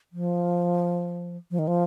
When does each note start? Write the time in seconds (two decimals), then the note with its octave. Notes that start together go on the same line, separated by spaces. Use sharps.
0.13 F3
1.51 F3
1.59 D#3
1.68 F3